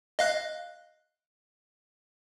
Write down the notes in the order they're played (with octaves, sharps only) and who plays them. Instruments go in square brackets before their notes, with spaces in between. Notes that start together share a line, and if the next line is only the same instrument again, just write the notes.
[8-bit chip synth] D#5 F5 F#6